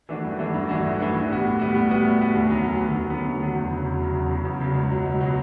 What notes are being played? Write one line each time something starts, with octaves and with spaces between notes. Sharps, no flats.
E3 A3 D4 F#4
G2
E3 A3 D4 F#4
G2
E3 A3 D4 F#4
G2
E3 A3 D4 F#4
A2
G3 B3 F#4
A2
G3 B3 F#4
A2
G3 B3 F#4
A2
G3 B3 F#4
D2
D3 F#3 B3
D2
D3 F#3 B3
D2
D3 F#3 B3
D2
D3 F#3 B3
E2
C#3 F#3
E2
C#3 F#3
E2
C#3 F#3
E2
C#3 F#3
C#2
B2 F#3
C#2
B2 F#3